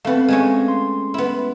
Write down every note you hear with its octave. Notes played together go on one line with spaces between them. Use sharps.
A3 B3 C4 F5
G#3 A3 C#4
C6
B3 E4